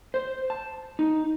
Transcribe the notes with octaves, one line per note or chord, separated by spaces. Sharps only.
C5
A5
D#4